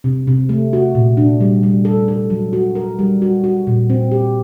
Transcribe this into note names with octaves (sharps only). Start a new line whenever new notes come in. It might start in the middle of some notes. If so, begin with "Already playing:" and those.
C3
C3
A3
F#4
A#2
D4
G3
G3
A4
A4
F#3
F#4
A#4
G3
F#4
F#4
A#2
C4
G4